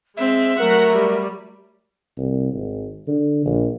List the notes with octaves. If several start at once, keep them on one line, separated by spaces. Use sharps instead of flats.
G#3 C4 E5
F#3 A3 A#4 F#5 A#5
G3
C2
G#1
D3
A#1